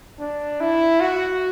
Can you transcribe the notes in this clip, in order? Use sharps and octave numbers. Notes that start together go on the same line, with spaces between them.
D4
E4
F#4